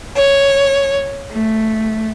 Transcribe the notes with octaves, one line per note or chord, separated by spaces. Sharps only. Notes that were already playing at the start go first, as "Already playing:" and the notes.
C#5
A3